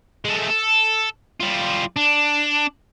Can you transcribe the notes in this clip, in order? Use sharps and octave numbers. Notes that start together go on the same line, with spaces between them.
G#3 A3
A4
G3 F4
D4